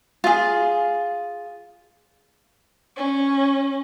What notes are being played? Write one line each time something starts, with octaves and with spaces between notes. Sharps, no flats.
F4 G#4
C#4